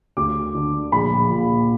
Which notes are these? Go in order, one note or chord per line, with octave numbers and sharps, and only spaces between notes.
D2 D6
D3
A#1 B5
A#2